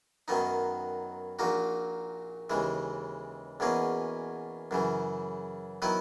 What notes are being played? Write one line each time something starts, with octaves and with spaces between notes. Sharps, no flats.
F#2 D#3 F#3 B3 D#4
A#1 A#2 A#3 D#4 F#4
D#2 C#3 E3 G#3
E2 B2 A#3 C#4 G#4
F#2 C#3 E3
D#3 F#3 B3 E4 B4